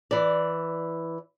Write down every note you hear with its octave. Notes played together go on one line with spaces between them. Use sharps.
E3 D5